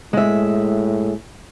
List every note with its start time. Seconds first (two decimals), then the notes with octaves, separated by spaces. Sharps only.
0.13 A2 G#3 E5